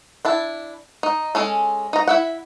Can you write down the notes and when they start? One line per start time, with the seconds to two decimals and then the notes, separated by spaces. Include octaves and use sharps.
0.25 D4 E4 A5
1.03 D#4
1.35 G#3 C#4 A4
1.93 D#4 A#5
2.07 E4 E5 F#5